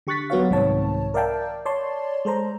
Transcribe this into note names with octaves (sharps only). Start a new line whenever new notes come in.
D3 G4 C#6 F#6 A6 B6
F#3 B3 F#4 C#5 F5
C2 G#2 D#3 C4 C#5 A5
A#4 D5 E5 F5 G5 A5
C#5 D5 A5 C6
G#3 A4 C5 A#5